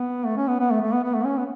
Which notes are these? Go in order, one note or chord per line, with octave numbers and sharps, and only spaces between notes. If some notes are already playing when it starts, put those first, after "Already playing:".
Already playing: B3
A3
C#4
B3
B3
A3
A3
B3
B3
A3
C#4
B3